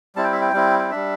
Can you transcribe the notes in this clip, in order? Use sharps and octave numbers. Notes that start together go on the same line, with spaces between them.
G3 C4 E4 A5
G5
E5
G5
G3 C4 E4
G5
G3 D4 E5